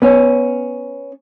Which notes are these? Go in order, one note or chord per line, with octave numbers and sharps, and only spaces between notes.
B3 C#4